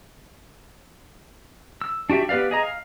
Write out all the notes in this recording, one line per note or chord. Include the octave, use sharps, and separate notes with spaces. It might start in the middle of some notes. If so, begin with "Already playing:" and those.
E6
D4 F#4 G4 E5
B3 G4 B4 D5 F5
G#4 D#5 A#5
F5